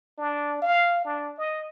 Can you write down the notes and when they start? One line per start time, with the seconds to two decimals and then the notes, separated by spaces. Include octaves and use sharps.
0.18 D4
0.62 F5
1.05 D4
1.38 D#5